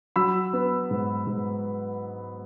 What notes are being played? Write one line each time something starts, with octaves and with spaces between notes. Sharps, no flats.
F#3 B5 E6
B3
G#2
G#2